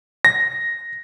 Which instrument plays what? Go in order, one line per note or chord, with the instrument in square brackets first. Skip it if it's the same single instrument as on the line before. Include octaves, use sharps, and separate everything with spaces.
[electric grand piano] A#6